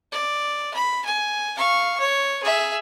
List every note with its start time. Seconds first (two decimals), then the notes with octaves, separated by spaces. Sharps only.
0.12 D5
0.74 B5
1.05 G#5
1.57 F5 C#6
2.00 C#5
2.43 G#4 E5